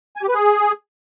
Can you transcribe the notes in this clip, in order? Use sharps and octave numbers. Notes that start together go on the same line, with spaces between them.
G#5
G4
B4
G#4